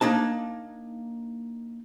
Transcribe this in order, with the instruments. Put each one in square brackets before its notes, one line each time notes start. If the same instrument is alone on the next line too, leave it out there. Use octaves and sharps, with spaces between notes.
[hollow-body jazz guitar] A#3 D4 D#4 A5